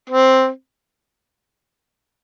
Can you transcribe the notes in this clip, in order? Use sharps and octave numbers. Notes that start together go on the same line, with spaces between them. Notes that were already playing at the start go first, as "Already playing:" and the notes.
C4